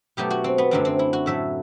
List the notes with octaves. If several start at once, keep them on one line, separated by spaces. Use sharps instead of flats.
B2 F#3 A3 G4
F#4
C4
B3
F#2 D3 F#3 A3 C4
C4
E4
F#4
A2 F#3 A3 E5